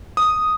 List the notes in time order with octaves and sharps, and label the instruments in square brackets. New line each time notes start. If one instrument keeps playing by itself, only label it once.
[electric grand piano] D#6